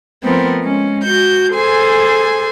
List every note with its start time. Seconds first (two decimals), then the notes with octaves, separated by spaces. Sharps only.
0.24 F3 A3 B3 C4 A#4
0.63 G#3 C#4
1.02 F#4 G6
1.53 G#4 A4 C5 G#5